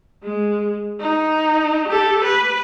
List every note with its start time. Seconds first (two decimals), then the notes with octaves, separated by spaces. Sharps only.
0.23 G#3
1.00 D#4
1.88 G4 A4
2.24 B4